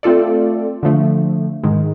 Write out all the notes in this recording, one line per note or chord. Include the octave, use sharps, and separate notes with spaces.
A3 C4 F4 A4 D5
D3 F3 A3
G#2 D#3 G#3